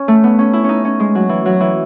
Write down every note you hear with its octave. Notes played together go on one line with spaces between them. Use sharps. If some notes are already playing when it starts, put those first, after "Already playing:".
Already playing: C#4
A3
B3
C#4
E4
C#4 D#4
C#4
G#3
F#3
E3
F#3
E3